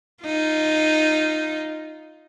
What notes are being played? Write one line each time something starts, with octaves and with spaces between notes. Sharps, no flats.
D#4 F4